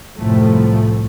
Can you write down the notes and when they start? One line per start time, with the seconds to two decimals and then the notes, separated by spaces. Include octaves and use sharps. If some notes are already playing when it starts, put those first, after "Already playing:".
0.17 C2 F#2 A2 F3 A3